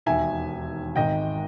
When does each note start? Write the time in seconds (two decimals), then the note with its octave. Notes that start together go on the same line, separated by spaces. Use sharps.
0.06 E1 D#2 D#3 E5 G#5
0.96 G#1 G#2 D#3 D#5 G5